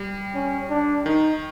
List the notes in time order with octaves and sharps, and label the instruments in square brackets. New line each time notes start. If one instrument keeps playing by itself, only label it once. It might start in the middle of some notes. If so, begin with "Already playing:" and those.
Already playing: [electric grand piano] G3
[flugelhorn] C#4
D4
[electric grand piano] D#3 [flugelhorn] D#4